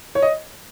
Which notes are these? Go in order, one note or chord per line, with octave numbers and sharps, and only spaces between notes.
C#5
D#5